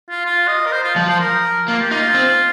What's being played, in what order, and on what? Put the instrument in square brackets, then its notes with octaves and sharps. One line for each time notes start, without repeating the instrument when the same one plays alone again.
[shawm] F4
F4
D#5
A#4
C5
F4
[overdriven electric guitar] F3
[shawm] C5
A#4
[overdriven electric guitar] A#3 [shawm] F4
[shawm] G4
[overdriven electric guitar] D#4 [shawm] F4
[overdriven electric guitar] C4